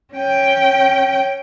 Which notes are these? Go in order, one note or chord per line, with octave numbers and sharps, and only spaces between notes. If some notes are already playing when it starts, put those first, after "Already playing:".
C#4 G5